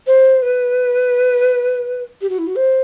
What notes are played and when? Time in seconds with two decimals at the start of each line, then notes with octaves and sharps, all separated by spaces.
0.07 C5
0.42 B4
2.21 G4
2.29 F#4
2.38 E4
2.47 F#4
2.57 C5